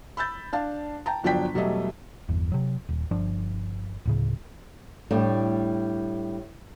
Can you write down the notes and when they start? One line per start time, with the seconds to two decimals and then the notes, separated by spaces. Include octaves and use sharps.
0.17 B5 E6 G6 A6
0.53 D4 F5 A5
1.06 G5 A5 A#5
1.24 G1 F3 F#3 D4 G5 B6
1.54 E1 F#3 G3 A3 D#5 E5
2.29 G1 E2
2.52 C3 F#3
2.89 D#1
3.11 G1 F3 D4
4.05 D1 A2 C#3
5.11 A2 G3 A3 D4